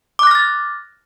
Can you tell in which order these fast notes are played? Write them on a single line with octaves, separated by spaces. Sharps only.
D6 F#6 A#6 F6 A6